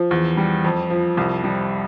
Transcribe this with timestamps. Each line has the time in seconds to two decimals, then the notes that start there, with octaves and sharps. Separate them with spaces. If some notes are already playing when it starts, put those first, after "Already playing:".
Already playing: F3
0.11 E2
0.37 G3
0.64 F2
0.90 F3
1.17 C2
1.44 G3